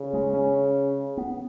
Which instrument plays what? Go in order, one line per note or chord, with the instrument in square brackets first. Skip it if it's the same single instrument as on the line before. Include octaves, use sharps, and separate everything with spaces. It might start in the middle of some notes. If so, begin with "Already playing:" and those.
Already playing: [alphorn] C#3
[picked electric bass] G#3
C#4
B3